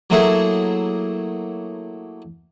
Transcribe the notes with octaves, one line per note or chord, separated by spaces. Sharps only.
F#3 A3 A#3 E4 G#4